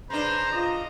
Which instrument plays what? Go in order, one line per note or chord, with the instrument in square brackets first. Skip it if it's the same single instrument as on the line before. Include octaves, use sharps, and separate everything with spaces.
[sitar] C#3 D4 [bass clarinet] B4 [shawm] C5 [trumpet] A#5
[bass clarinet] F4 [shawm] D#5